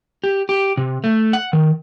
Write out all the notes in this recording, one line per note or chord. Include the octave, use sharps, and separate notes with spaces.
G4
G4
C3
A3
F#5
D#3